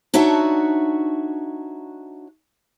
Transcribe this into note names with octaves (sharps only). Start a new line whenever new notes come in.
D4 D#4 F#4 C#5 E5 A5